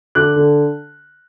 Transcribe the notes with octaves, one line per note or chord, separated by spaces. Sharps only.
D3 D6 F#6
D3